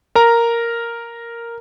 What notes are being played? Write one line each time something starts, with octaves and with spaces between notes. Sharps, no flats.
A#4 A#5